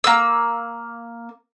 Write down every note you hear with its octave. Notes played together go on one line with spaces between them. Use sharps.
A#3 E6